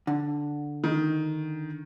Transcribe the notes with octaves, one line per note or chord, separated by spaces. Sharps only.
D3
D#3